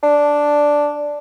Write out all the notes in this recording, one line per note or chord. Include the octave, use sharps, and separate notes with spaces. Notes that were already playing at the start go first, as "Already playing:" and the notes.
D4